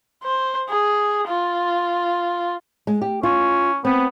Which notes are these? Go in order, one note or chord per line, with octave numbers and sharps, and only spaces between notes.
C5
G#4
F4
G#3
G4
C#4 F4
B3 C4